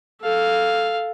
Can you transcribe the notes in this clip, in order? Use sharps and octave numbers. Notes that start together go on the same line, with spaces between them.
A4 F5